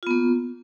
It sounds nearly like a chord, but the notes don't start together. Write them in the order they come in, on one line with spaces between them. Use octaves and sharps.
F4 B3 A#3